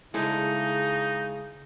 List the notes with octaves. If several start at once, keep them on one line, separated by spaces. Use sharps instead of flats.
C#3 G#3 D#4 E4 A4